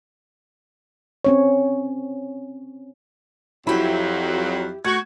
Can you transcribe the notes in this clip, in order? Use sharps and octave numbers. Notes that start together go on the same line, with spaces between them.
C4 C#4 C#5
F2 F#3 E4 G4 E5 B5
A3 F#4 G#6